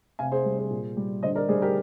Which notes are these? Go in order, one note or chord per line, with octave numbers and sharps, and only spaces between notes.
C3 F5 G#5
G#4 C5
G3
G#4 C5
A#2
G3
D3 C5 D#5
A#4 D5
G3 G#4 C5
G4 A#4